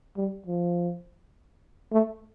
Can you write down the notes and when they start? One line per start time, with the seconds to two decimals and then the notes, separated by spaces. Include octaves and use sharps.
0.17 G3
0.47 F3
1.92 A3